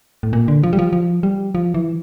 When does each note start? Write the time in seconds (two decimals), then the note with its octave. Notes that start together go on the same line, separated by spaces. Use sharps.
0.23 A2
0.33 A#2
0.48 D3
0.63 F3
0.73 G3
0.79 F3
0.93 F3
1.23 G3
1.55 F3
1.74 E3